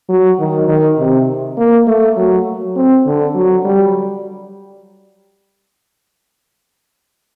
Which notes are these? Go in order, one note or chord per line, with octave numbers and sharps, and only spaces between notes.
F#3
D#3
D#3
C3
A#3
A3
F#3
C4
D3
F#3
G3